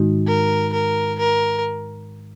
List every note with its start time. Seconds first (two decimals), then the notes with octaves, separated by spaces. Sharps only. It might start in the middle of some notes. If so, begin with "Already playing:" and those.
Already playing: G#2 D#3 G#3 D#4 F#4
0.27 A#4
0.73 A#4
1.19 A#4